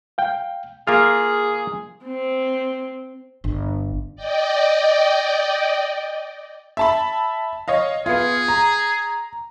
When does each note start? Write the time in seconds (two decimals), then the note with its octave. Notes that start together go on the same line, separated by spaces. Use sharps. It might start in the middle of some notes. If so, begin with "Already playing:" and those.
0.18 F5 G5
0.87 A#3 F4 G#4 F6
2.06 C4
3.44 G1
4.16 D5 D#5 G5
6.77 E5 A5 B5
7.68 C#5 D#5 F5
8.06 B3 F4 G#4
8.48 A#5